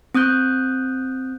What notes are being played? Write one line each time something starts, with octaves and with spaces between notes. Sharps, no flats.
C4 D#6 F#6 G6